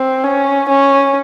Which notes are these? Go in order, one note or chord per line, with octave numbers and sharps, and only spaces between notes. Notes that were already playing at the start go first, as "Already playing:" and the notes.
Already playing: C4
C#4
C#4